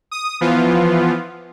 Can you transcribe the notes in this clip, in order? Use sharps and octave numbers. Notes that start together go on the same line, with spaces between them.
D#6
E3 F3 B3 F4